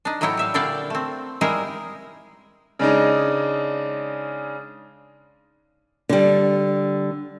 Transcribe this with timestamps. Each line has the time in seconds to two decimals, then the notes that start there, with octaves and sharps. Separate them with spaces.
0.05 D4 D#4
0.21 A2 F#3 D#4 E4 C#5 G5
0.37 G3 E5 F5
0.54 A#2 D3 E4 D5 F5 G5
0.90 A3 C4
1.41 G3 G#3 D#4 E4 G#4 A#4
2.79 C#3 G#3 D4 D#4
6.09 D3 G3